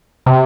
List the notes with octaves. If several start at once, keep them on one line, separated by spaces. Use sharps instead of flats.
C3